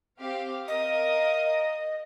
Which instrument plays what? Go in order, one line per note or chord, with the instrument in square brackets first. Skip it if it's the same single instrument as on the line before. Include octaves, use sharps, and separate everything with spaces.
[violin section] C4 G4 F5
[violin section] A#4 F5 D#6 [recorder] D#5